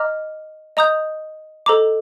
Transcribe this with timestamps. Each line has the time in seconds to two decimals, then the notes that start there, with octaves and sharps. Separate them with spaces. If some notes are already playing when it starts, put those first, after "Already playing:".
Already playing: D#5 A#5 D6 F6
0.77 D#5 A#5 D#6 G6
1.66 A4 C5 D#5 A#5 D6